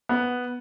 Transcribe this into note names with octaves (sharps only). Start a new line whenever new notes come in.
B3